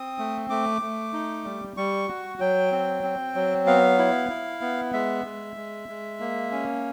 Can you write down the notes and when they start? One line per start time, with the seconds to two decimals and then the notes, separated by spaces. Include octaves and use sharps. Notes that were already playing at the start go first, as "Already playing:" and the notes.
Already playing: C4 D#6
0.18 A3
0.50 A3 D6
0.82 A3
1.13 D#4
1.45 G3
1.77 G3 C#6
2.08 F#4
2.40 F#3 G5
2.72 C4
3.04 C4
3.35 F#3
3.66 B3 F5
3.98 E4
4.29 E4
4.61 B3
4.93 G#3 E5
5.25 G#3
5.56 G#3
5.89 G#3
6.20 A#3
6.52 C#4